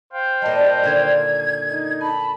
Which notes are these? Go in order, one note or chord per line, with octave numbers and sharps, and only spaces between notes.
C5 F5 G5
A#2 G3 D#5 A5
A#2 D3 D#3 G#6
D#4
G#5 A5 B5